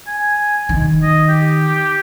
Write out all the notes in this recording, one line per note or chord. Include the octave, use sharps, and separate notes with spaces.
G#5
D#3
D#5
G4